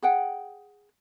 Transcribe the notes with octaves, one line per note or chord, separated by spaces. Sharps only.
G#4 F#5 G5